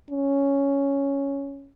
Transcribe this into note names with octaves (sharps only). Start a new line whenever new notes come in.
C#4